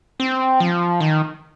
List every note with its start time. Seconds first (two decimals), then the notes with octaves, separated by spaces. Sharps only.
0.20 C4
0.60 F3
1.00 D#3